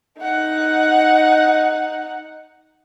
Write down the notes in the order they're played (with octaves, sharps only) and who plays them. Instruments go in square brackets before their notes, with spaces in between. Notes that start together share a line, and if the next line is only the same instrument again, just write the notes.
[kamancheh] D#4 F#5